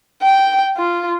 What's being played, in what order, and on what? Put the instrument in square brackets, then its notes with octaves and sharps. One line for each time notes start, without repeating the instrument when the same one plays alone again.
[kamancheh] G5
F4